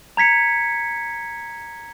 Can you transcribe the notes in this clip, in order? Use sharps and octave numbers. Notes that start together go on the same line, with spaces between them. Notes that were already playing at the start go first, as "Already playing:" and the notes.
A#5 G#6 B6 C#7